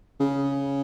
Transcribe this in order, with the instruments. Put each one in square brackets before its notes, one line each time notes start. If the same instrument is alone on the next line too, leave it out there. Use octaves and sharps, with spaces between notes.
[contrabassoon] C#3